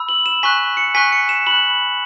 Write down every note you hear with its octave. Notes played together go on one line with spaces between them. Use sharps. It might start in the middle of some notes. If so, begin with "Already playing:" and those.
Already playing: B5 E6
F#7
E7
G#5 C#6 F#6 B6
C#7
G#5 C#6 F#6 B6
C#7
E7
B5 F#6 F#7